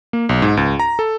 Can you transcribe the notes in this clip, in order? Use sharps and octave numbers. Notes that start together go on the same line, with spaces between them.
A#3
B1
G#2
C#2
A#5
A4